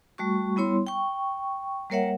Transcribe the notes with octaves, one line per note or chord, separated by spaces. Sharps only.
G3 A3 F#4 C#6
G3 B3 E4 C#5 C6
G5 C#6
G3 A#3 A#4 C#5 E5 F#5